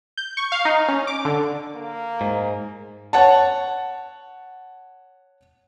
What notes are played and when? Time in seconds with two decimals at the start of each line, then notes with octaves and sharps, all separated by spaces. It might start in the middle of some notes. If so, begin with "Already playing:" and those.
0.17 G6
0.37 C#6
0.52 F5
0.65 D#4
0.88 C#4
1.07 D6
1.25 D3
1.75 A#3
2.21 G#2
3.13 C#5 F#5 A5